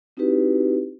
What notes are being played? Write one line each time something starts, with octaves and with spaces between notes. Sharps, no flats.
C4 D#4 E4 F#4 G4 B4